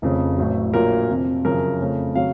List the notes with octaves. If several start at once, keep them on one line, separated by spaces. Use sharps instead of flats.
F1 F2 C#3
A1 A2 F#3
A#1 A#2 F#3 A#3 F4 A#4
F2 C3 F3 C4
F#2 C#3 F3 A#4
F2 C#3 A3
C#3 F#3 C4 F5